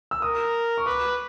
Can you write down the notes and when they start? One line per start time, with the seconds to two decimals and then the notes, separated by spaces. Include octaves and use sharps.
0.11 E6
0.22 A#4 D#6
0.78 C#6
0.86 B4 D6